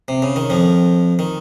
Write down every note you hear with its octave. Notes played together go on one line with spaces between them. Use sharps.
C3
C#3
D#3
F2 F3
D#3